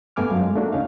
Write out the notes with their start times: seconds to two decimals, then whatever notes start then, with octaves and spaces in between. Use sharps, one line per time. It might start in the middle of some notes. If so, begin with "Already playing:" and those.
0.16 G2 A3 B3 G#5 D6 F6
0.30 F#2 F#3 F5
0.41 G#3
0.56 A3 A#3 D4 F#4
0.72 C#2 C#4 D#4 F5